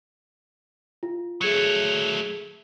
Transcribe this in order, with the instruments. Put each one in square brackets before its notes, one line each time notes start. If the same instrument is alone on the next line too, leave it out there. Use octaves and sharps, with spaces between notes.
[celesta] F4
[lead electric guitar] F#3 A3 [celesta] G#4 G#6 C#7